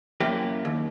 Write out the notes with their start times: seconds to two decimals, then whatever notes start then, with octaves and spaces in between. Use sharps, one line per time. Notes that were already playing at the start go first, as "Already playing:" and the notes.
0.20 F#2 A#3 E4 G4
0.65 D#2